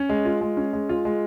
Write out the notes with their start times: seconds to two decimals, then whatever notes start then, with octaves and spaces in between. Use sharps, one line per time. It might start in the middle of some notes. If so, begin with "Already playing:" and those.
Already playing: C#4
0.09 G#3
0.25 F4
0.41 G#3
0.57 C#4
0.73 G#3
0.89 F4
1.05 G#3